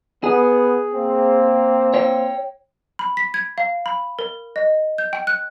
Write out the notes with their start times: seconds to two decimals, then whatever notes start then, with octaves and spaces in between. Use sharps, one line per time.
0.24 B3 G#4
0.94 A#3 C4
1.94 C#5 G5
2.99 B5
3.17 B6
3.34 G#6
3.58 F5
3.86 B5
4.19 A#4
4.56 D#5
4.98 G6
5.13 G5
5.27 F#6